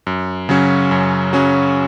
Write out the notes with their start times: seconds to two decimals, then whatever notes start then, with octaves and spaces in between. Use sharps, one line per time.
0.07 F#2
0.49 C#3 F#3 C#4 F#4
0.91 F#2
1.33 C#3 F#3 C#4 F#4